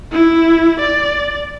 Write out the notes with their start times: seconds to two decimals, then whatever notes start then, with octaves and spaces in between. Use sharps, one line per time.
0.12 E4
0.80 D5